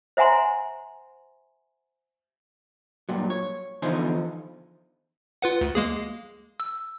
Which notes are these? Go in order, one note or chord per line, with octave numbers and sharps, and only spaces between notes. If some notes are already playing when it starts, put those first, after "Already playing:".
C5 E5 F#5 G#5 A#5 C6
G2 A#2 F#3
C#5
E2 D3 F3 D#4 C5 G#5
F4 B4 F#5
D2
G#3 A#3 G#4
E6